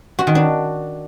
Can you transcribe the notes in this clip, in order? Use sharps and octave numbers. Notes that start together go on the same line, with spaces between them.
F#4
D#3
D4